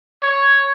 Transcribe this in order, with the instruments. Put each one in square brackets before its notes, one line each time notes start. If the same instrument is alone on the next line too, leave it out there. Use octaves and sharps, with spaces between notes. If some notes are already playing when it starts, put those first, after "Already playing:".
[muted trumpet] C#5